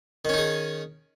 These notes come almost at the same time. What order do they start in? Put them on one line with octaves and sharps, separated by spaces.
D#3 C#4 D#4 G#4